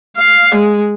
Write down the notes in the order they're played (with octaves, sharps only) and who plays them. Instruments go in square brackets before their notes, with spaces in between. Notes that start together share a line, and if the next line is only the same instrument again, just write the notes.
[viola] F5
G#3